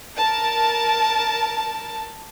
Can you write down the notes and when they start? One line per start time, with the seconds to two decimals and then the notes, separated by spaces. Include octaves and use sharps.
0.14 A#4 A5